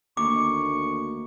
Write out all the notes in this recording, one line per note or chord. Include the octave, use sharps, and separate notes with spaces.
D2 D#3 A#3 C#6 D6